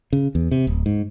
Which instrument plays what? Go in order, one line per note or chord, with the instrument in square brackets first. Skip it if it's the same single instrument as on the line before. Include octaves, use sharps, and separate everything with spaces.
[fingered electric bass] C#3
E2
C3
D1
G#2